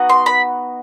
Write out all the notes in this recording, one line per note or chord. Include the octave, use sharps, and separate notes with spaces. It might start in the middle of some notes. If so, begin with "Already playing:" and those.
Already playing: B3 D#4 F#4
C6
B5